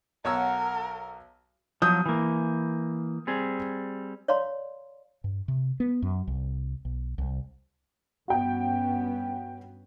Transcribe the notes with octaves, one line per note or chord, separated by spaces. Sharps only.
B1 F#4 A4 A#4 C#5 F#5 E6
F3 F#3 D#6 G6
E3 A#3
G3 C4 G#4
C#5 D5 F5 A#5 C6
G2
C3
B3
F#2
C2
B1
C2
G2 B3 C#4 F#4 G5